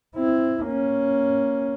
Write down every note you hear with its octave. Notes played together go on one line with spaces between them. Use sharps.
C4 E4
A#3 C#4